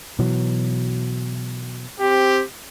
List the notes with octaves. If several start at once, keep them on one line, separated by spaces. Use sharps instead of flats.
B2 E3 F#3
C4 G4